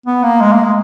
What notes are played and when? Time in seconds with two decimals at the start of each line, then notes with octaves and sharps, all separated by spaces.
0.06 B3
0.23 A#3
0.41 G#3
0.52 A#3
0.64 G#3